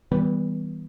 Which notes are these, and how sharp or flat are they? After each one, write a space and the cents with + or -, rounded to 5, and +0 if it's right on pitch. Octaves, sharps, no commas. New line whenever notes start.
E3 -30 G3 +0 B3 +0